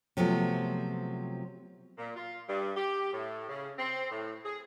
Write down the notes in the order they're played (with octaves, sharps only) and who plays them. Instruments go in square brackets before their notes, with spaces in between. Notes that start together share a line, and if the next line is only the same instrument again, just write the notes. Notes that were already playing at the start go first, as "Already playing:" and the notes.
[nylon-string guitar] C3 F3 F#3 A3 B3
[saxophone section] A#2
F4
G2
G4
A2
C#3
C4
A2
G#4